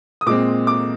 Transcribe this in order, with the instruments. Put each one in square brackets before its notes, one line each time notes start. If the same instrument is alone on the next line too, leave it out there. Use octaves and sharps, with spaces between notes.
[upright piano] D#6
A#2 G#3 C4 D6
D6